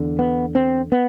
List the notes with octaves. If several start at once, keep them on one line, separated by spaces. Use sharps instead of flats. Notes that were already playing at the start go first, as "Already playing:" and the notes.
Already playing: E2 D3
B3
C4
B3